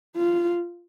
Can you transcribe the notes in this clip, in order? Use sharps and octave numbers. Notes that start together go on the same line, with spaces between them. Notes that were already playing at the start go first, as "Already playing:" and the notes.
F4